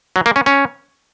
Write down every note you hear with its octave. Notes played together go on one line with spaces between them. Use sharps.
F#3
A#3
C#4
C#4